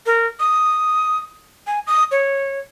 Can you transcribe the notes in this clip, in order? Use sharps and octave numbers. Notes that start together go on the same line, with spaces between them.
A#4
D#6
G#5
D#6
C#5